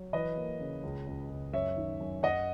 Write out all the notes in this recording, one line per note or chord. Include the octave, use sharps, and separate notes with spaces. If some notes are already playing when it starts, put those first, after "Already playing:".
Already playing: F#3
E3 B4 D#5
A#3
C#3
C#2
C#2
C#2
F#2 C#5 E5
D#3
F#2
F#2 D#5 F#5